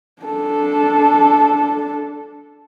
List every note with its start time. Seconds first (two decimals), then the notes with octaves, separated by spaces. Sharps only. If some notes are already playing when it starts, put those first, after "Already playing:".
0.22 D4 A4